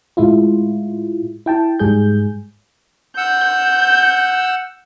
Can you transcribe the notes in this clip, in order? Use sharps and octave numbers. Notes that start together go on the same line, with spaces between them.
A2 G#3 E4 F4
E4 G5 A5
G#2 G3 G#4 G6
F#5 E6 G6